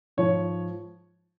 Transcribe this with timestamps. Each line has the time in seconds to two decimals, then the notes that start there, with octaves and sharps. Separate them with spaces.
0.17 G#2 F3 C#5